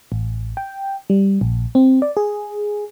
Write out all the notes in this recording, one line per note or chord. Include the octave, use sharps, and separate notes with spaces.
A1
G5
G3
A#1
C4
D5
G#4